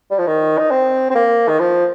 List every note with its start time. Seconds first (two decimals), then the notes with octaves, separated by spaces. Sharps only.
0.10 G3
0.18 F3
0.27 D#3
0.58 D#4
0.71 C4
1.10 C4
1.15 A#3
1.48 D#3
1.59 F3